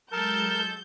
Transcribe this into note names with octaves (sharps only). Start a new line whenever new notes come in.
F#3 G#3 A4 A#4 A5 G6